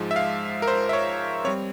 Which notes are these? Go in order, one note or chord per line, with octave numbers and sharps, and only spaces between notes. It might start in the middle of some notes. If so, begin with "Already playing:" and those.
Already playing: G#2 F3 G#3
E5
F5
A#4
C5
E5
C#5
G3 C4 C#5